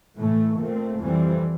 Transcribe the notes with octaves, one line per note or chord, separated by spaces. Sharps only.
A2 E3 A3
A#2 A3 C4
F2 E3 G3 C4